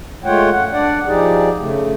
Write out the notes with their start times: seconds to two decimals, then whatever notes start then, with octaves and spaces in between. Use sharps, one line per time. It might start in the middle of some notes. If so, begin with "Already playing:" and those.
0.24 G#3 A3 F4 C#5 F#5 G5
0.51 F#2 F#5
0.72 D4 D5 F#5
1.07 F3 D#4 G4 G#4 D5
1.59 C#3 A3